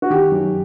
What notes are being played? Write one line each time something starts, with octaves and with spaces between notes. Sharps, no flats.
F#4
D#3 G4
F#2